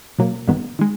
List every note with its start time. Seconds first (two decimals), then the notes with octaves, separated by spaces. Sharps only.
0.19 B2 F#3 A#3
0.48 G1 G2 D#3 G#3 B3
0.79 D#3 G#3